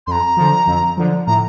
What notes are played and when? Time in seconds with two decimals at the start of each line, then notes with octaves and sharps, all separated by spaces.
0.07 F2 A#5 C6
0.36 D3 F3
0.67 F2
0.97 D3 F3
1.27 A2 A#5